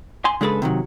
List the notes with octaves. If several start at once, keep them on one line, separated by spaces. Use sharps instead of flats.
G#5 C6
C#3 G#3 D4 G#4 A4 B4
C3 D#3 F#3